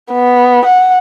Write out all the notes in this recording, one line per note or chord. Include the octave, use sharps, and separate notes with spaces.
B3
F#5